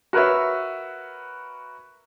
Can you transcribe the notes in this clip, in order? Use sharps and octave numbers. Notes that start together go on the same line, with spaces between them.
F#4 A#4 B4 C#5 E5